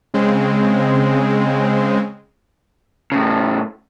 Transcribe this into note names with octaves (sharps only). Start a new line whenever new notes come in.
C#3 G#3 C4
A2 C#3